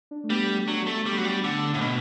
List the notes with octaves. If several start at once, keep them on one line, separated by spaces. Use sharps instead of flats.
D4
A3
G3 B3
A3
F#3 D4
A3
G3
F#3
G3
D3
A2
B2